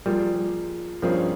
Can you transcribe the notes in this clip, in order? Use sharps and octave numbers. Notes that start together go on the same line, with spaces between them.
F3 G3 A#3 F4 G#4
G2 F3 G3 A#3 C#4 G#4